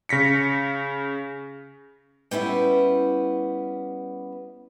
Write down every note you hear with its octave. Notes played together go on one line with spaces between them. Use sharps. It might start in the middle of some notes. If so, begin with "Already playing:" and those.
C#3 A#6 B6 C#7
G3 B3 C#4 E4